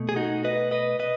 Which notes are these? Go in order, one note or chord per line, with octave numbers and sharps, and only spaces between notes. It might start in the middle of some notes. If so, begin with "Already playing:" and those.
Already playing: B2 A3
G#4
D#4 F#4
B4 D#5
B4 D#5
B4 D#5